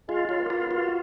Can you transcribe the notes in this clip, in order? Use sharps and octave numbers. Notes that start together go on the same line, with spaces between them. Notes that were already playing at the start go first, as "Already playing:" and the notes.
G#3 F4
F#3 F4
B3
A#3
F4
B3
F4
F#4